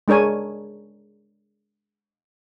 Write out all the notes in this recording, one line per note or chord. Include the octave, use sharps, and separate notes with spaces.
G#3 D4 A#4 C#5 G#5